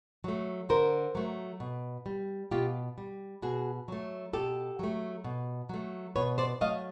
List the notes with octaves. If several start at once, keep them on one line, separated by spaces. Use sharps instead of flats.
F#3 A3
D3 A#4 C5
F#3 A3
B2
G3
B2 F4 G4
G3
B2 F#4 G#4
F#3 A3
B2 G4 A4
F#3 A3
B2
F#3 A3
B2 B4 C#5
C5 D5
F#3 A3 D#5 F5